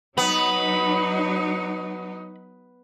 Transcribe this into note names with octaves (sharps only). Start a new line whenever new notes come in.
F#3 B3 D#4 B5